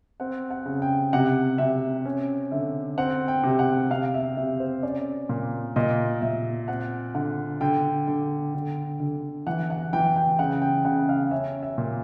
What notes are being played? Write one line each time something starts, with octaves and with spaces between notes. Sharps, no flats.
C4 F#5
F#5
C#3
G5
C3 F#5
C3 E5
C#4
D3 E5
C4 F#5
G5
C3
F#5
C3 F5
E5
C3 E5
C5
C#4 D5
A#2
A#2 D#5
A#2 E5
C4 F#5
D3 F#5
D3 G5
D3
D3
D3
E3 F#5
F#5
E3 G5
G5
C#3 F#5
G5
C#3 F#5
F5
C#4 E5
E5
A#2